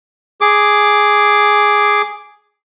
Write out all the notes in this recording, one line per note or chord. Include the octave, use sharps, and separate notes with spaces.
G#4 D6